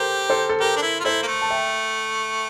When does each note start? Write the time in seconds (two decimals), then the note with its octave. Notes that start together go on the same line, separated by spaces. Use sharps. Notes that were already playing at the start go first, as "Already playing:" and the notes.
Already playing: G4 A4 A#4 C5
0.30 A4 C5
0.49 A4
0.60 G4 A#4
0.77 D4
0.82 E4
1.00 F4
1.05 E4 A4 C5
1.23 A#3
1.27 A3
1.42 A5
1.50 E5 G5